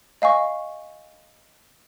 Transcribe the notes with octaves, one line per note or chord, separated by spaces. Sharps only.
D#5 F5 G#5 C#6